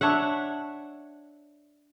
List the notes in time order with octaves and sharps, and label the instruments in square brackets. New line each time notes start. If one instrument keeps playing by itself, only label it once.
[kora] D4 C#5 E5 F#5